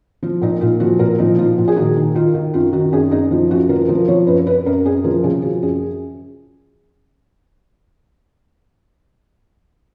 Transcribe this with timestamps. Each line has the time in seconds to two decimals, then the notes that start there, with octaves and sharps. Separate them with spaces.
0.23 F3 F4
0.42 A#2 D#4
0.61 A#2 F4
0.80 F3 F#4
0.99 A#2 A#4
1.19 F3 D#4
1.38 F3 F4
1.58 A#2 F4
1.68 G#4
1.76 D#3 F#4
1.97 D#3
2.15 D#3 F4
2.35 D#3
2.54 F#2 F4
2.73 D#3 F#4
2.93 F#2 G#4
3.12 F#2 D#4
3.31 F3
3.51 F#2 F#4
3.69 F3 A#4
3.88 F3 A#4
4.08 F3 C#5
4.27 F#2 B4
4.47 F#2 B4
4.66 F#2 A#4
4.85 F#2 G#4
5.04 F3 A#4
5.24 C#3 G#4
5.42 F3 F#4
5.62 F#2 G#4